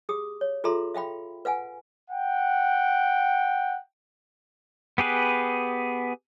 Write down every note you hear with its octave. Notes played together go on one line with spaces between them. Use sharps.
G4 G#4 D#6
C#5
F4 G#4 A4 E5 A#5 C6
E5 F5 G5 B5
B4 F5 F#5 G#5
F#5 G5
B3 G4 G#4 B4